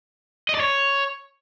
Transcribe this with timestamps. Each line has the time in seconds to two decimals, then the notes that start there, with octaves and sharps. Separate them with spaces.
0.49 D#5
0.55 D5
0.60 C#5